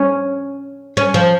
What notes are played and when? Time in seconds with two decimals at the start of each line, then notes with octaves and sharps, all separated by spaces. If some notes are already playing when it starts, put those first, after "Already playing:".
Already playing: C#4
0.97 C#4
1.14 F3